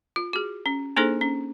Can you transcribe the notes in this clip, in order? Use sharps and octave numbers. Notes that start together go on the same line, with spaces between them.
F4
F#4 G#4
C#4
A#3 D4 D#4 G#4 A4 C5
C#4